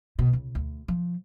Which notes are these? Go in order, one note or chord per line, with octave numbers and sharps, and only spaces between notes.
B2
C#2
D2
F3